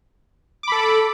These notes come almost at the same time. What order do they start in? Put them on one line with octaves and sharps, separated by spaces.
D6 B5 A4